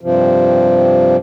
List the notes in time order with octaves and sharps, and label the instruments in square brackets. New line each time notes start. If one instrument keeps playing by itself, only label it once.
[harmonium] G2 C3 F3